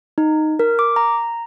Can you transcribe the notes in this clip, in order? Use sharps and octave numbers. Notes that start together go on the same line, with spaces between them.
D#4
A#4
D6
A#5